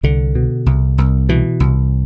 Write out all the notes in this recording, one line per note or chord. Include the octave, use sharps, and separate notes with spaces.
C2 D3
B2
C2
C2
B2 E3
C2